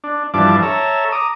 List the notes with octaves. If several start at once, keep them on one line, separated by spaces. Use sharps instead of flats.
D4
G2 E3 F3 D4 A5 D6
A4 C#5 E5 A#5
A#5 D6 D#6